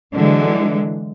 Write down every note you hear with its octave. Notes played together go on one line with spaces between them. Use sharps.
D3 E3 F#3 G#3